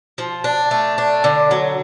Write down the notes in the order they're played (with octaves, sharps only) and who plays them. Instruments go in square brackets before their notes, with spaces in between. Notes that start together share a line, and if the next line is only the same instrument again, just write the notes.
[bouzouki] F3
D4
A3
D4
D3
F#3